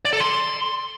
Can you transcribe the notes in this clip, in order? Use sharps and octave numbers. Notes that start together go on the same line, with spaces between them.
D5
A4
C6